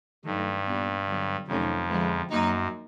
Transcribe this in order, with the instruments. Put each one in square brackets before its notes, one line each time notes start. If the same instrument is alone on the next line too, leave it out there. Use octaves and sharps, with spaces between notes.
[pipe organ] G2 [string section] D#3 F#3 A3
[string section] A#2 G3 B3 D4
D3 F#3 B3
[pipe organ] F2 [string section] C3 D#3 F#3 A3 C#4
[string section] D3 F3 G#3 B3 E4
[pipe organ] F#2 [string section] F#3 A#3 D#4